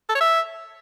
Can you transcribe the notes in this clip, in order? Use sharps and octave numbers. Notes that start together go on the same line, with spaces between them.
A4
C#5
E5